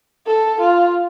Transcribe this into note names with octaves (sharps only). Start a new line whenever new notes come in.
A4
F4